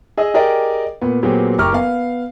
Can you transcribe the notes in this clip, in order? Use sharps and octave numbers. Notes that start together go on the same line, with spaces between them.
G#4 D#5 E6
G4 G#4 A#4 D5 D#5 G5
A#2 B3
A#2 F#3 B3 C4 G4 G#4
F#1 G4 A#5 C#6 D6 F6
B3 F5